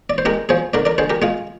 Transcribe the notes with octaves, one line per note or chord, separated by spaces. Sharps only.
D5
C5
G#3 G4 A#4
F3 G#4 C5
D3 A#4 D5
A#4 D5
D3 G#4 C5
G4 A#4
G#3 F4 G#4